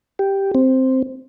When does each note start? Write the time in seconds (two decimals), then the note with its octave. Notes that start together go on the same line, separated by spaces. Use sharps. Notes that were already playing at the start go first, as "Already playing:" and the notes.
0.19 G4
0.55 C4